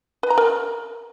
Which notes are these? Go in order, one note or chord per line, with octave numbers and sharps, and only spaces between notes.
B4
A#5
A#4